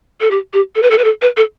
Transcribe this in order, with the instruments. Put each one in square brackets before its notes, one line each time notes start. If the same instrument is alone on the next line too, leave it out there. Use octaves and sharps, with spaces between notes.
[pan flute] A4
G4
G4
A4
B4
A4
B4
A4
B4
A4